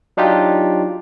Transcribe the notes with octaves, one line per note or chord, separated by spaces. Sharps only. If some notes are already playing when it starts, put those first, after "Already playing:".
F#3 D4 D#4 F4 G4